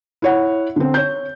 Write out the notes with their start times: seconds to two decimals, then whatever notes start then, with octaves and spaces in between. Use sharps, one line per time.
0.22 E4 C#5 F#5
0.76 D3 C4
0.94 C#5 G6